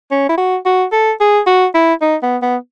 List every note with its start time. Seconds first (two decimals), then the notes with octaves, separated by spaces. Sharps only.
0.11 C#4
0.29 E4
0.38 F#4
0.65 F#4
0.92 A4
1.21 G#4
1.47 F#4
1.74 E4
2.02 D#4
2.23 B3
2.42 B3